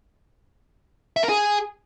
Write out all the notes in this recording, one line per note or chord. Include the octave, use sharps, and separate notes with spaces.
E5
A#4
G#4